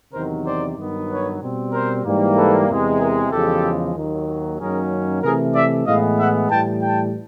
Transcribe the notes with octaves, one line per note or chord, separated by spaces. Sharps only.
E2 C3 D#3 F#3 A#4 C5
C5 D5
G2 D#3 F#3 B3
B4 C#5
B2 G3 C4
A#4 C5
G#2 E3 G3 A#3
A4 B4
E2 C3 E3 G#3
G#4 A#4
E2 C#3 F3 G#3 G4 A4
D#2 D#3 F#3
F#2 D#3 F#3 A#3 C#4 G#4 A#4
C3 E3 A3 G#4 A#4
D5 E5
A2 E3 G#3 B3 D#5 F5
E5 F#5
A2 E3 G3 G5 A5
G5 A5